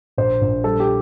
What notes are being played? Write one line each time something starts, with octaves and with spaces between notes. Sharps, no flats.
A#1 C5
A#1
G3 A4
G4